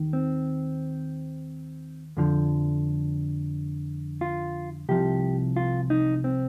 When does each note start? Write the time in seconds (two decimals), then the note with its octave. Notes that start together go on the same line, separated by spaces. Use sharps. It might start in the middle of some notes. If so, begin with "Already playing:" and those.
Already playing: D#2 D#3
0.13 C4
2.17 F2 D3 F3
4.21 F4
4.89 C2 C3 F3 G4
5.56 F4
5.90 D#4
6.24 C4